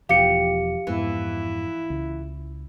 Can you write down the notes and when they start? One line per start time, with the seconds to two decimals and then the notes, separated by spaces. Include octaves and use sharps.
0.09 E1 E2 F3 G4 F5 C#7
0.87 F2 G#2 E3 B3 E4
1.90 C#2